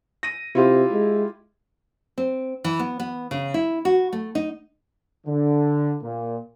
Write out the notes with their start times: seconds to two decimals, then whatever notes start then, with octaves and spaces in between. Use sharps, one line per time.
0.23 A#6 D#7
0.55 C3 E4 F4 G4
0.92 G#3
2.18 C4
2.64 E3
2.79 B3
3.00 B3
3.31 C#3
3.54 E4
3.85 F#4
4.12 A3
4.35 D#4
5.26 D3
6.02 A#2